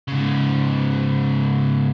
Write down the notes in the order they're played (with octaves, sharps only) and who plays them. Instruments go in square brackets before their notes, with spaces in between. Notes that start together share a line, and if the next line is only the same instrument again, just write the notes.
[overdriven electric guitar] G#2 C#3